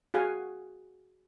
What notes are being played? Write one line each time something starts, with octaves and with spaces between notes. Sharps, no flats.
F#4 G#4 F5 F#5 G#5